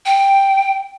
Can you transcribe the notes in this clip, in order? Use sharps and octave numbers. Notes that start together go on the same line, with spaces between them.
G5